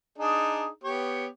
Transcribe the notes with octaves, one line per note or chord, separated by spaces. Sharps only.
D4 D#4 G#4
B3 G4 C#5